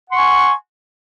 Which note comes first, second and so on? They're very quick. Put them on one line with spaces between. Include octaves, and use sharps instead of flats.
F#5 C6 C#6 G#5